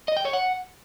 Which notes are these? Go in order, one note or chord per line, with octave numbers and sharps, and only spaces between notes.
D#5
G5
C#5
F#5